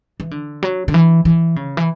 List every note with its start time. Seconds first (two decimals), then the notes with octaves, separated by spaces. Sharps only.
0.20 E3
0.31 D3
0.63 F#3
0.88 D3
0.94 E3
1.25 E3
1.56 C#3
1.77 E3